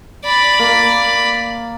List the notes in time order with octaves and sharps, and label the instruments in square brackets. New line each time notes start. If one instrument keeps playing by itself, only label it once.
[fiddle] D5 B5
[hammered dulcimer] A#3